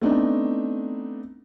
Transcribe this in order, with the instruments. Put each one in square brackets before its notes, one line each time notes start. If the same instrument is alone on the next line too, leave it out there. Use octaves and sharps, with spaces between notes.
[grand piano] A3 B3 C4 D4 D#4